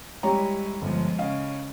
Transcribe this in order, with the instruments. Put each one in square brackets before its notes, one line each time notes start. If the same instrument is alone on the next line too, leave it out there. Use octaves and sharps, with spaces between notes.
[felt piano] G3 C#5 A#5 [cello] G#3 E4
[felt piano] G1 [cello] F3 G#3
[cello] C#3 [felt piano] D#5 F5